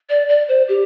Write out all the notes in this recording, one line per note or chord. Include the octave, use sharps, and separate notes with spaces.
D5
D5
C5
G4